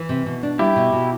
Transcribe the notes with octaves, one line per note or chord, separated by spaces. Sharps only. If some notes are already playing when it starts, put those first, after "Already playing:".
Already playing: E3
C3
B2
D4
G3 E4 G4
B2
B2